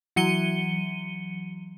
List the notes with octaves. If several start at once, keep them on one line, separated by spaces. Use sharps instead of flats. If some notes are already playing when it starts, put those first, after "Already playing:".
E3 F#3 C#7 D#7 G7